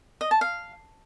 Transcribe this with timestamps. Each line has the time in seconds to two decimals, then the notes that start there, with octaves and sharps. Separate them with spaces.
0.21 D#5
0.31 A5
0.41 F5